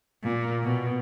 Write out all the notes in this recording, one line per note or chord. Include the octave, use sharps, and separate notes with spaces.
A#2
B2